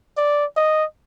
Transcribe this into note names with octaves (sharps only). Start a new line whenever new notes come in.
D5
D#5